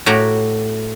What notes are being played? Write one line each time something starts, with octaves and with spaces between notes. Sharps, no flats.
A2 F#4 G4 A#5